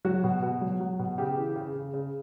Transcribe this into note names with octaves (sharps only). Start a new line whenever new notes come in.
F#3 F#4
B2
B2
F#3
F#3
B2
C#3 G4
E3
C#3
C#3
C#3